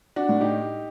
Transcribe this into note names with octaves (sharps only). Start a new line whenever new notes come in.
D4 F#4
A2
D#4 G4